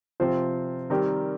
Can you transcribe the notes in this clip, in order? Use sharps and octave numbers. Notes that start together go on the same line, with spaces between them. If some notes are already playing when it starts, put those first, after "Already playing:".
C3 F3 C4 F4 C5
D#3 G3 C4 G4 A#4